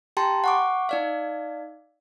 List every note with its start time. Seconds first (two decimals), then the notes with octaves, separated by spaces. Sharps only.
0.17 G4 G5 A5 A#5 C6
0.44 F#5 C#6 D6
0.89 D#4 D5 F5